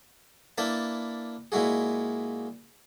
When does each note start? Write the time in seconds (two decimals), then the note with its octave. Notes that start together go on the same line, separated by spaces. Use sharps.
0.58 A#3 D4 E4 B4 A5
1.52 A#2 G#3 E4 F#4 G#4